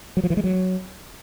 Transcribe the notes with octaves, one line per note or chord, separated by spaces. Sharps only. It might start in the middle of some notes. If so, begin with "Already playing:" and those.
F#3
F3
E3
G#3
F#3